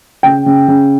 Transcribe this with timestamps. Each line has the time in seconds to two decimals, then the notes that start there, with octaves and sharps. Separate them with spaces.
0.23 C#3 G5
0.46 C#3
0.68 C#3